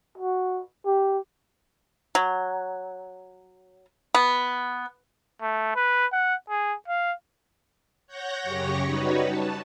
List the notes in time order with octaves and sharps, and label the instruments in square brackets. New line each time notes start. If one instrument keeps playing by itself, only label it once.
[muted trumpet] F#4
G4
[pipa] F#3
B3
[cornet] A3
B4
F#5
G#4
F5
[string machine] C#5 F#5 G6 A#6
F#2 C#3 G4 C#5 C#6 A#6
G3 D#4 F#4 B4 C#5
A5